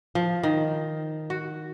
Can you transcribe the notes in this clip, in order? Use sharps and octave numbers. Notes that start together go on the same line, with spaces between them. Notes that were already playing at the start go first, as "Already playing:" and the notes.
F3
D#3
F#4